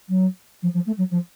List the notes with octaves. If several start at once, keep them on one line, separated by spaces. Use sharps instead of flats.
F#3
F3
F3
A3
F#3
F3